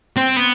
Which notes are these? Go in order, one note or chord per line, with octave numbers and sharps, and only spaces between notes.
C4
B3